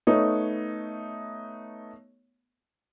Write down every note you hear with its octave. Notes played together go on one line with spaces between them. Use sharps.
A3 B3 D#4 C#5